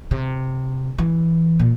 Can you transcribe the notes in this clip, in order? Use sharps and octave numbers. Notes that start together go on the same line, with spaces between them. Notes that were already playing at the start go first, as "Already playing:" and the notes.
C3
E3
A#2